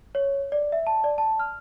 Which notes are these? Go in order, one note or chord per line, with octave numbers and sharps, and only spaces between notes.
C#5
D5
E5
A5
D5
A5
F6